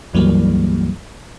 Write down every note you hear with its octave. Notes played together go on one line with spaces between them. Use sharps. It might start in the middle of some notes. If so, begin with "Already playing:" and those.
C#2 G2 E3 F#3 G3 A#3